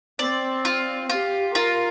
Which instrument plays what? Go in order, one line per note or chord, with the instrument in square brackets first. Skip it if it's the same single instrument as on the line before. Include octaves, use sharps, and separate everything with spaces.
[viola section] C4 [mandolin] D5
[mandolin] F4
[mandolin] F4 [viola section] G4
[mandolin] F4 [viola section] A#4